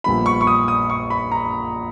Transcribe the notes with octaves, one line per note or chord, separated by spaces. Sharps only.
A#1 A#2 G3 B3 B5
C#6
C#6
D#6
D#6
C#6
B5
A#5